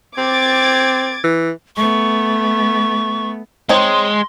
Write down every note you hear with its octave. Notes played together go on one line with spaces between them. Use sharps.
C4 D6 G#6 A6
E3
A3 B3 C#6
G#3 C4 D#4 C#5 C6